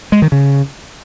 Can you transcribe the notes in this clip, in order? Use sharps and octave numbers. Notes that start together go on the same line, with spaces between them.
G#3
D#3
C#3